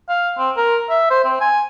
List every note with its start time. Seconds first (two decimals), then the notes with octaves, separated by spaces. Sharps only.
0.09 F5
0.38 C4
0.57 A#4
0.90 E5
1.10 C5
1.24 C4
1.41 G#5